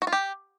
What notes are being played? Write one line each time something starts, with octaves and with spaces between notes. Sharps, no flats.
F#4
F4
G4